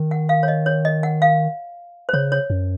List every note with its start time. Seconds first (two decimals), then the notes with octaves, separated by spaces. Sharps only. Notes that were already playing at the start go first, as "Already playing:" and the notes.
Already playing: D#3
0.11 F#5
0.29 F5
0.43 C#5
0.48 D#5
0.66 C#5
0.85 D#5
1.03 F#5
1.22 F5
2.09 C5
2.13 C#3 C#5
2.32 C#5
2.50 F#2